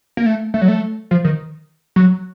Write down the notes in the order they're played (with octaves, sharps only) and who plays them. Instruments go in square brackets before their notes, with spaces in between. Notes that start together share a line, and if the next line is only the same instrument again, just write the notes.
[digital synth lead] A#3
A3
A3
F#3
A3
F3
D#3
F#3